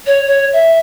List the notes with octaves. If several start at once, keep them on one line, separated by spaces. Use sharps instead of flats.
C#5
C#5
E5